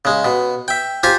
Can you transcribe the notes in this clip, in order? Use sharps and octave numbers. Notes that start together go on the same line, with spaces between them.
C#3 G#3
B2
E5 G5
F4 G4 C5 G#5 A#5